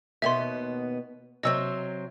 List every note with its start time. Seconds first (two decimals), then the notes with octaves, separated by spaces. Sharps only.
0.22 D#2 B2 B3 E5 C6
1.43 C3 F#3 C4 D#5 E6